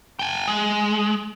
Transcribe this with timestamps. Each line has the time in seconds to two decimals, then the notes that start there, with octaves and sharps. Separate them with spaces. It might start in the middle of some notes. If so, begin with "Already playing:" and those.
0.19 G5 G#5
0.47 G#3